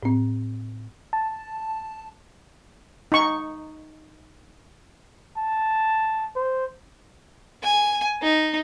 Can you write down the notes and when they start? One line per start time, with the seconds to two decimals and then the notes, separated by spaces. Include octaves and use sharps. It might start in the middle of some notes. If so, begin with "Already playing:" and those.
0.03 A2 C4
1.13 A5
3.12 D#4 C#6
5.37 A5
6.36 C5
7.63 G#5
8.23 D#4